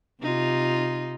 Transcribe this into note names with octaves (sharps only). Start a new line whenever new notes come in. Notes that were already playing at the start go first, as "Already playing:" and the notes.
C3 D#4 F4